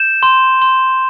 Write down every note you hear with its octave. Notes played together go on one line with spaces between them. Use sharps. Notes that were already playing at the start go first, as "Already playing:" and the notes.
Already playing: G6 E7
C6
C6